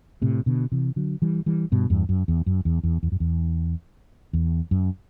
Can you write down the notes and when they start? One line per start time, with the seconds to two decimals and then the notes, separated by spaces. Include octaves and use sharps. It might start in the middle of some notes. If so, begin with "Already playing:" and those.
0.22 A2 C3
0.46 B2 D3
0.72 C3 E3
0.96 D3 F#3
1.22 E3 G3
1.46 E3 G3
1.72 G2 B2
1.90 E2 G2
2.09 F#2
2.28 E2
2.46 F#2
2.65 E2
2.83 E2
3.03 E2
3.12 F#2
3.20 E2
4.33 E2
4.71 F#2